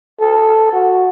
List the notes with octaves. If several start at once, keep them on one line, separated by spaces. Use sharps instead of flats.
A4
F#4